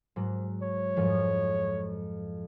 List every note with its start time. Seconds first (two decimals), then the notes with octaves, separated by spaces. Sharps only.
0.16 G#2 F#3
0.63 C#5
0.96 F2 G#2 F3